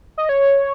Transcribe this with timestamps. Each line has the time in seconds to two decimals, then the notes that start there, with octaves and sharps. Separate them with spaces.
0.18 D#5
0.29 C#5